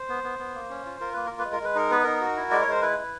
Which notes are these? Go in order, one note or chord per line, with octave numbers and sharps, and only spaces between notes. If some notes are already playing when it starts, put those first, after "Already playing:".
Already playing: C5
B3
B3
B3
A#3
C#4
F4
F4 A#4
A#3 B4
F4 A#4
B4
G#3
A#4
G#3 B4
D#4 A#4
B3 B4
D#4 A#4
F#4
E4
G#3 D5
C#5
G#3 C5
E4 B4
E4